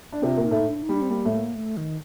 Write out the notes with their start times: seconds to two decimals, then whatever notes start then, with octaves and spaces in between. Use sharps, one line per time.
0.12 D4
0.22 C3 C4 F4
0.37 A#2 A#3
0.45 D#4
0.51 A2 A3
0.67 D4
0.83 D#4
0.89 G3 D4
1.02 C4
1.10 G3 A#3
1.25 A2 A3
1.32 A#3
1.55 A3
1.77 D#3